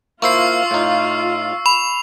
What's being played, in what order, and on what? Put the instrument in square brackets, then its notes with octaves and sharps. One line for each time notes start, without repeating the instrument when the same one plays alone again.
[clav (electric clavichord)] A#3 E4 C5 [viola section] F4 [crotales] C#6 E6 C7
[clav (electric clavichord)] A2 D#4
[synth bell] B5 [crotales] F7